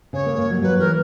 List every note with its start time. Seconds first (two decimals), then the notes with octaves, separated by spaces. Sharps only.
0.13 C#3 C#5
0.26 A#3
0.38 A#3
0.51 F#3
0.62 F#3 B4
0.79 E3 A#4